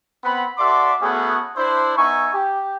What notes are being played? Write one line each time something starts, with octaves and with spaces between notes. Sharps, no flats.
B3 C4 F#5 B5
F#4 A4 D5 E5 C6 D6
A3 B3 C#4 F#4 G#4
D4 E4 C5
B3 D#4 E5 G#5 C#6
G4